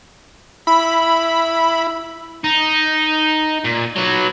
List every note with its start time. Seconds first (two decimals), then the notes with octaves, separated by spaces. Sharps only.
0.67 E4 B5
2.44 D#4
3.65 A#2
3.96 F#3 B4